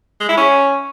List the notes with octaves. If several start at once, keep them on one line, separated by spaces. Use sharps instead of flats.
G#3
E4
C#4